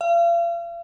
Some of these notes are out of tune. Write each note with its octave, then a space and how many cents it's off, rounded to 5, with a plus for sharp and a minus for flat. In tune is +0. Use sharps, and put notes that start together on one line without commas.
F5 -40